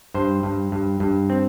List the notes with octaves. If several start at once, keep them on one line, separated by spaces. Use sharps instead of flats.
G2 C5
G2
G2
G2
C4